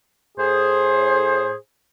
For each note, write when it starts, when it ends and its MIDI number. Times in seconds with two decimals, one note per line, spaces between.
0.38 1.54 45
0.38 1.54 68
0.38 1.54 72